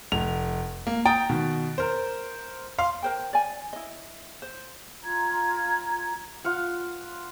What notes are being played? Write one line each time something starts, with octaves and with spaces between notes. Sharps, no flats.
F1 F7
A#3
G5 A#5 D#6 A6 D7
B2 D#3
A#4 C5
F5 C6
A#4 C5 G5
D5 G#5
E4 D#5
C5
F4 A#5 G#6
F4 F5 F#5